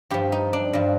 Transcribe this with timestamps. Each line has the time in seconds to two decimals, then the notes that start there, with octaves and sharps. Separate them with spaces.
0.10 G2 F3 G4
0.32 D#4
0.53 D4
0.73 G2 F3